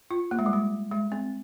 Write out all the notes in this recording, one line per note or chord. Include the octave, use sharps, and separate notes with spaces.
F4
A#3
G#3
G3
G#3
G#3
C4